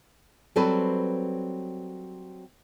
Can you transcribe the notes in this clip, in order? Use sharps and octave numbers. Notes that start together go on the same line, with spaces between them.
F#3 G3 C4 A4 B4 C5